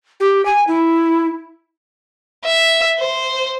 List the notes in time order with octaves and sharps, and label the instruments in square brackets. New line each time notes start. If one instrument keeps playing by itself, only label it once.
[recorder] G4
G#5
E4
[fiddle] E5
C5